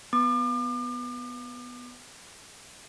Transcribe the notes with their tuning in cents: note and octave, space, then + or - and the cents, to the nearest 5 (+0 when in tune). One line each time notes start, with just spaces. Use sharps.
B3 +0 D6 +40